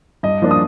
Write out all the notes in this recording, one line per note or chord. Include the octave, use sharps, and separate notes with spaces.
G2 D#5
F3 A#3 D4
D#6